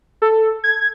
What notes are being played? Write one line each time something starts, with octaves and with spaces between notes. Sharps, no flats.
A4
G#6